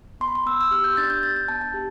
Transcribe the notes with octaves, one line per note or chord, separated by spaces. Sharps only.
B3 C6
B5
C6
B3 E6
E6
G4 F6
G6
D4 A6
G6
B3 A6
G6
B3 A5
A5
G4